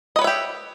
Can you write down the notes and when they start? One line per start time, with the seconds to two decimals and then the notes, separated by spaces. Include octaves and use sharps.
0.16 D#5
0.19 B4
0.21 C#5
0.24 E5
0.27 G4